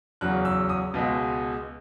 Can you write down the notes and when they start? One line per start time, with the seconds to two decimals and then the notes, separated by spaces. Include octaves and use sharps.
0.21 E2 C#3 F#3 F#6
0.45 E6
0.69 D#6
0.94 C#2 B2 G#3